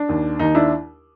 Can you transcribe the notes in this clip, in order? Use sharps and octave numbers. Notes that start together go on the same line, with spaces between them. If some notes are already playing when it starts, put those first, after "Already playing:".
Already playing: D4
D#2 D#3
D#2 D#3 D#4
D4 E4